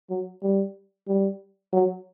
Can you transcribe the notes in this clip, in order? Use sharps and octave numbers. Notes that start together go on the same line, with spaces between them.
F#3
G3
G3
F#3